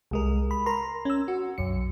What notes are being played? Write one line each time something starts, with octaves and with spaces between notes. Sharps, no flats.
C2 G#3 A#4
B5
A#4 A#5 C6
C#4 E6
F#4
B1 F#2 C#7